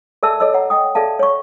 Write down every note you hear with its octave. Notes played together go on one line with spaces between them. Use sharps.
A4 A#4 D5 E5 A5 E6
A4 C#5 D#5 E6
C#5 F#5 A#5
D#5 G5 D#6
A4 D5 E5 F5 A5
C#5 C#6